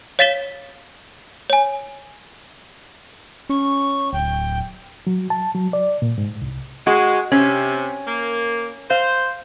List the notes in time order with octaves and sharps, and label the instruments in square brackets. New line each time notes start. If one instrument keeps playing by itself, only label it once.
[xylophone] C#5 F5 A6 B6 E7 G7
C#5 G#5
[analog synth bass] C#4 [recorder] C#6
[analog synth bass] D1 [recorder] G5
[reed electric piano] F#3
A5
F#3
D5
A#2
G#2
C2
[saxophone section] G#3 [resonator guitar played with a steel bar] F#4
[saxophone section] C3 [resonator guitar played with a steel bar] C#4
[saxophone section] A#3
[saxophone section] C5 [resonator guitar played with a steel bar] F5